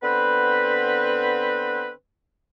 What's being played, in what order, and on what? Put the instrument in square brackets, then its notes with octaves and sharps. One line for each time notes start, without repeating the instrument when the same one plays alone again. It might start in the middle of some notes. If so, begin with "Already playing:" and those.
[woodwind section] D3 B3 C4 B4